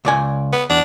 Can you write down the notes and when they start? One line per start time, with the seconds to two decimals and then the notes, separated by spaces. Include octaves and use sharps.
0.05 C#2 D5 G#5
0.52 B3
0.70 E2 D4